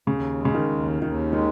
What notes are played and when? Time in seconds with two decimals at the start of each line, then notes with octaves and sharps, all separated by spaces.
0.07 D#2 C#3
0.39 G#3
0.45 C#3
0.54 D#3
0.70 D#2
1.02 D#2 D#3
1.32 D#3 G#3